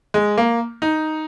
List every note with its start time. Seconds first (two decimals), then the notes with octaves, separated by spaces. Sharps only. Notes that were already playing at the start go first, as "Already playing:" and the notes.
0.14 G#3
0.38 A#3
0.82 D#4